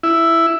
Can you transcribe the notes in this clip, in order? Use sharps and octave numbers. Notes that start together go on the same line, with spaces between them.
E4